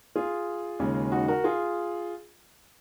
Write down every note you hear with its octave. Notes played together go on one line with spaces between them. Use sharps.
F4 G#4
D#2 C#3 G#3
D#4 F#4
F#4 A#4
F4 G#4